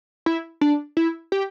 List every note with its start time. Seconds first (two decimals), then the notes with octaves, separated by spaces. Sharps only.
0.26 E4
0.61 D4
0.97 E4
1.32 G4